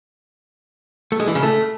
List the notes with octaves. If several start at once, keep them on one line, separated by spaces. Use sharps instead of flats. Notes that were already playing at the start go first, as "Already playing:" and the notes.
A3
G#3
E3
C#3
A3